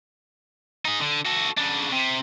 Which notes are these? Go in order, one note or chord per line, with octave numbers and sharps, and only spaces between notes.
D#4 G#4
D3
F#4 A4
C#3 D4
C3